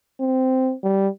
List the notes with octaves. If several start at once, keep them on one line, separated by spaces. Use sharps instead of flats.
C4
G3